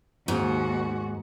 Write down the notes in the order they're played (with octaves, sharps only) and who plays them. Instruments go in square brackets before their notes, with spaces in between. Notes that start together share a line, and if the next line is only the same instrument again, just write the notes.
[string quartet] D#2 F#4 [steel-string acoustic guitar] G#2